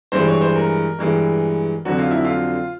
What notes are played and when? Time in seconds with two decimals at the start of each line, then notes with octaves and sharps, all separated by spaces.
0.12 G2 E3 G#3 C5
0.27 C#5
0.41 C5
0.55 A#4
0.99 G2 E3 G#3
1.85 F2 D3 F#3 F#4
1.98 F4
2.11 E4
2.25 F4